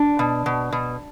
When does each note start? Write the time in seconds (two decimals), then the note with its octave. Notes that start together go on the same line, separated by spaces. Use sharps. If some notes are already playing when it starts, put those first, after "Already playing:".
Already playing: D4 D5
0.19 B2
0.46 B2
0.73 B2